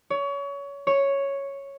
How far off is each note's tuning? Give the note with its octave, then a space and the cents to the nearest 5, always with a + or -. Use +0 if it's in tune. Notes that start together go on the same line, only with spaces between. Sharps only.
C#5 +25
C#5 +0